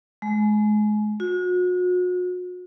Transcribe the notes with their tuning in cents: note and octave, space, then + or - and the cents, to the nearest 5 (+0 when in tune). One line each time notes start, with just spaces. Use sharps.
G#3 +30
F#4 -40